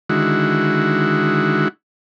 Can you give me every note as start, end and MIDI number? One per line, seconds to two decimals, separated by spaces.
0.09 1.68 50
0.09 1.68 51
0.09 1.68 56
0.09 1.68 64
0.09 1.68 66